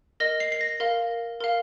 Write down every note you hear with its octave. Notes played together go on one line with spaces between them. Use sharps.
A#4 D#5 A#6
C7
C7
A#6
A#4 F5
A#4 F5